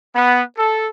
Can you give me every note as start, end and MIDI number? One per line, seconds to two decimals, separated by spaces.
0.15 0.42 59
0.57 0.87 69